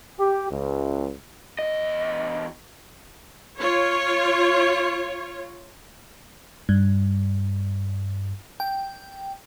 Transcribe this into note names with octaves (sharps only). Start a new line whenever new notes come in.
G4
C#2
E2 D#5
F4 C#5
G2
G5